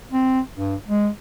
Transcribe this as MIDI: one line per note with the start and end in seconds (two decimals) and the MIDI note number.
0.12 0.40 60
0.56 0.75 43
0.88 1.09 56